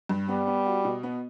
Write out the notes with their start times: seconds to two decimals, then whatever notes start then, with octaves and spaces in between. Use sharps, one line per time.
0.09 G2
0.28 G3 B3
0.47 B3
0.66 F#4
0.85 B2
1.03 B3